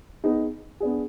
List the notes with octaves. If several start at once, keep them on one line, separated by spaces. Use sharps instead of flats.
B3 D#4 G#4
B3 D4 G#4